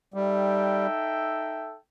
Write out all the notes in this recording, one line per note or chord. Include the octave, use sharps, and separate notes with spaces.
G3 D#4 A4 E5 G5